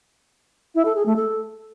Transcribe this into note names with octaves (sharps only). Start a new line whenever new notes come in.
E4
A4
G#4
A3
A4